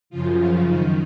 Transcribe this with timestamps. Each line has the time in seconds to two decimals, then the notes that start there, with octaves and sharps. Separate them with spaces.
0.10 F#2 C#3 F3 F4
0.38 F#2 C#3 F3 F4
0.66 F#2 D#3 D#4